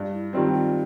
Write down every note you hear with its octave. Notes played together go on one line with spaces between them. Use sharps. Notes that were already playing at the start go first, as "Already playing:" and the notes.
Already playing: G2
E4
D#3 G3 C4 F4
F#4
F4